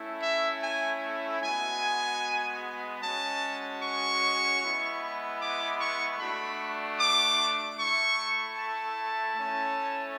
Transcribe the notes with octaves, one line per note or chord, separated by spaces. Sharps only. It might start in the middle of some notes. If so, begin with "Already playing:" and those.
Already playing: A3 C#4 E4
E5
G#5
G#3 B3 F#4 G#5
G#3 C#4 F#4 A5
C#6
G#3 B3 E4
D6
C#6
A3 D4 F#4 B5
D6
A3 E4 C#6
A5
A3 C#4 E4